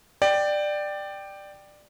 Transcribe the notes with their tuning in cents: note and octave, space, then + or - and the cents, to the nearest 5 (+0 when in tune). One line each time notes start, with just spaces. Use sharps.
D5 +15 G5 +0